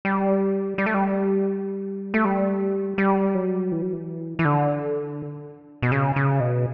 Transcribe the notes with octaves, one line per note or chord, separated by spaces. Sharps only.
G3
G3
A3
G3
A3
G3
G3
F#3
E3
F#3
E3
E3
D3
B2
C#3
C#3
B2